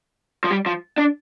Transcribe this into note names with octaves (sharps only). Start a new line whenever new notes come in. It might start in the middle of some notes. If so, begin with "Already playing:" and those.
F3
G3
F3
D4